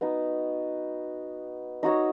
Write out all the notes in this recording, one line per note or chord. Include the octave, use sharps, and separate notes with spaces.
B3 D#4 F#4
D#4 F#4 C#5 E5